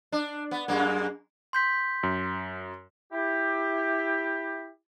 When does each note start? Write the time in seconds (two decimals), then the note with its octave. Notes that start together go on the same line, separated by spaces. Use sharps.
0.12 D4
0.51 B3
0.68 F#2 G#3 A#3
1.53 C6 G6 B6
2.03 F#2
3.12 E4 G4